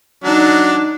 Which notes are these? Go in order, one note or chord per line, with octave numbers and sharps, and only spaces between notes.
F#3 D4 D#4